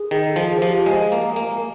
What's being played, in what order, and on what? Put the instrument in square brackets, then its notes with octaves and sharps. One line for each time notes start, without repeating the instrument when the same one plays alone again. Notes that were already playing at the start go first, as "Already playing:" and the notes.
Already playing: [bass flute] G#4
[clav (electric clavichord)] D#3
[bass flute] A4
[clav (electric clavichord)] F3 [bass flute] G#4
[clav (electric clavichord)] F3 [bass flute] G4
[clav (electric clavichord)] G#3 [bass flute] G#4
[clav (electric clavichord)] A#3
A#3